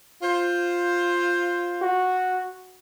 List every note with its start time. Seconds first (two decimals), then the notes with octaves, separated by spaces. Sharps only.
0.23 F4 C5
1.82 F#4